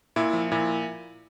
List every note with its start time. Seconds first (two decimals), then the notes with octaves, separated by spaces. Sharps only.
0.16 A#2 E4
0.33 F3
0.51 A#2 E4